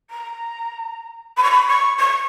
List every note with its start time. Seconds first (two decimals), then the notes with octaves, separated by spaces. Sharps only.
0.10 A#5
1.37 B5
1.43 C#6
1.51 B5
1.67 C#6
1.99 C#6